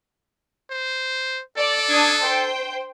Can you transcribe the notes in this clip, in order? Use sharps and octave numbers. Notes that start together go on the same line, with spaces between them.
C5
A4 D5
D4 D#6 G#6
C5 G5